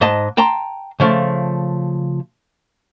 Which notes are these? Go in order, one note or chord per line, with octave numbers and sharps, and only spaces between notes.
G#2 D#5 A5
G5 A5 A#5 C6
C#3 F3 A3